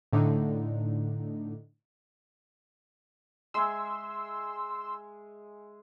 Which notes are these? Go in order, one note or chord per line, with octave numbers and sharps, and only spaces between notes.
A2 D3 D4 D#4
G#3 E5 G#5 C6 E6